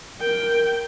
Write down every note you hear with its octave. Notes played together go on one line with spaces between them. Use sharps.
A#4 G5